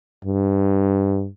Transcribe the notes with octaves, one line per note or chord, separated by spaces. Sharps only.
G2